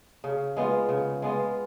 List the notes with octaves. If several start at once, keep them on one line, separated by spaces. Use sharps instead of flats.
C#3
G#3 B3 F4
C#3
G#3 B3 F4